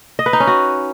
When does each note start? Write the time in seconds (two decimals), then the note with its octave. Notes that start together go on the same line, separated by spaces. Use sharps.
0.19 D#5
0.26 B4
0.33 D#4
0.40 C#4
0.47 F#4